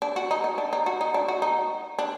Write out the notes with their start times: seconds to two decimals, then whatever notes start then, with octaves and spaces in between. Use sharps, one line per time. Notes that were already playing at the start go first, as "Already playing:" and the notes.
0.02 D4
0.16 F#4
0.31 D#4
0.44 D#4
0.58 D4
0.73 D#4
0.86 F#4
1.01 D#4
1.14 D4
1.28 F#4
1.42 D#4
1.99 D4